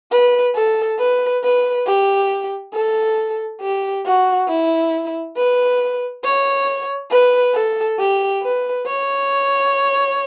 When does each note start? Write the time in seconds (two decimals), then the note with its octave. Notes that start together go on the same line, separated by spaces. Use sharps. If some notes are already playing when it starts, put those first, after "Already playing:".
0.11 B4
0.55 A4
0.99 B4
1.43 B4
1.86 G4
2.73 A4
3.61 G4
4.05 F#4
4.48 E4
5.36 B4
6.24 C#5
7.11 B4
7.55 A4
7.99 G4
8.42 B4
8.86 C#5